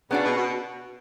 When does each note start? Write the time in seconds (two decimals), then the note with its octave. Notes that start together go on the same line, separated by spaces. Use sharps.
0.10 C#3 B3 D4 F#4
0.24 B2
0.37 B2